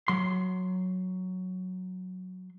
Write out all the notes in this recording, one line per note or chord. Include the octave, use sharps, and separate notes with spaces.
F#3 C6